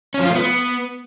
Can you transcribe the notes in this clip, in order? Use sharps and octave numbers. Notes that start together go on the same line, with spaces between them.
C#4
F3
F4
A3
B3